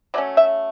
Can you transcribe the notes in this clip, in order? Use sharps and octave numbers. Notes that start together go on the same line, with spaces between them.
F#3 A3 C#4 D5
E5